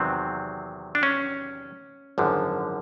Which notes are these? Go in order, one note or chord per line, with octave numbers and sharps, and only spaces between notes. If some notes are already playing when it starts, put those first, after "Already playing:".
Already playing: E2 C3 D#3 F#3 C4
D4
C#4
G#1 F#2 D3 F3